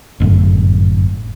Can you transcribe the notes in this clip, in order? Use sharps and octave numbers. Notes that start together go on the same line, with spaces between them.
G1 F#2 A2